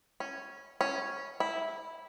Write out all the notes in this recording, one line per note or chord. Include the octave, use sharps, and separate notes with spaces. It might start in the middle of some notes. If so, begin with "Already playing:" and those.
C#4
C#4
E4